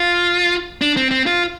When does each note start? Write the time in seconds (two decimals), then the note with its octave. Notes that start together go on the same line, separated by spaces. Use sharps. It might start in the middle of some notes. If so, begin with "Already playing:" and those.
Already playing: F4
0.81 D4
0.96 C4
1.11 C4
1.27 F4